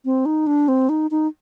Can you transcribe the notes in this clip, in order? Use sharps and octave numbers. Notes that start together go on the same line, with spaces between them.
C4
D#4
D4
C4
D#4
D#4